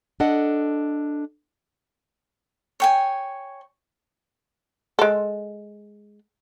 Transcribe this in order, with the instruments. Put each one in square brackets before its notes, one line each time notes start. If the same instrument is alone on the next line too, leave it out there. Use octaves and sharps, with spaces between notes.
[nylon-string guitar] D4 A4 D#5 F#5
[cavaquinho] C#5 G5 G#5
[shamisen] G#3 A4